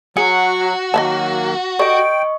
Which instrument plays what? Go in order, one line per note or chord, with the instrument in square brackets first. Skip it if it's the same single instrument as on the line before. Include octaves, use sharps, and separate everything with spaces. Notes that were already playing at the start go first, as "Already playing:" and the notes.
[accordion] F#3 [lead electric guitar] F#4 [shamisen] G#4 [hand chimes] C#7
[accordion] D#3 F#3 A#3 [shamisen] D#5 E5 A5
[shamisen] G4 A4 D5 [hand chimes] D#5 C#6 [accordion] G5